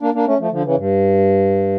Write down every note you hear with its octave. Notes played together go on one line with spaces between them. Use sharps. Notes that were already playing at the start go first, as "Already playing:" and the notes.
A#3 D4
A#3 D4
A3 C#4
F3 A3
D3 F3
C#3 E3
G2